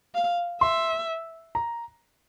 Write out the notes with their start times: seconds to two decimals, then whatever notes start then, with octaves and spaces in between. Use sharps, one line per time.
0.15 F5
0.61 E5 C6
1.55 A#5